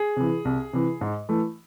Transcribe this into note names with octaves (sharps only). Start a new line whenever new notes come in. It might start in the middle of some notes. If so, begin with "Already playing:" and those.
Already playing: G#4
C3 E3
C2
C3 E3
G#2
E3 A3